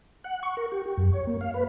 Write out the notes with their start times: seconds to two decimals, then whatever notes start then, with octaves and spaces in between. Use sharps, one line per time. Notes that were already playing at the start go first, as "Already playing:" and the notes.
0.24 F#5
0.43 C#6
0.57 A#4
0.72 G4
0.86 G4
0.98 F#2
1.13 C#5
1.27 A#3
1.41 F5
1.54 B4